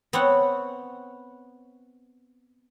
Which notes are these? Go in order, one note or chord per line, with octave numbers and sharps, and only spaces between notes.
B3 C4 C#5 F#5